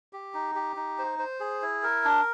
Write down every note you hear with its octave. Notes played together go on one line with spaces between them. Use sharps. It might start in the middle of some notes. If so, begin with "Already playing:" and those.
G4
D#4
G4
D#4
C5
C5
G#4
E4
A#4
D4